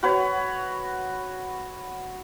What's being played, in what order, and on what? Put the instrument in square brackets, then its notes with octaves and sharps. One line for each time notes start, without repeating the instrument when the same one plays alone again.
[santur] F#4 B4 C#5